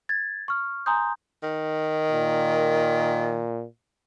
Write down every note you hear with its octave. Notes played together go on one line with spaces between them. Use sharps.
G#6 A6
C#6 F6
G#5 A#5 C6 D#6 G6
D#3
A#2